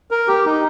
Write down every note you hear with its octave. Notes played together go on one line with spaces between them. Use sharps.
A#4
G4
D#4